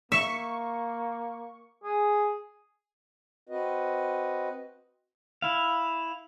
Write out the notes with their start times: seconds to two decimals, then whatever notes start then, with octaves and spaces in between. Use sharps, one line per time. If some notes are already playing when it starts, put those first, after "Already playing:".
0.12 A#3 E5 C#6
1.84 G#4
3.49 C4 F#4 B4 D#5
5.42 E4 F5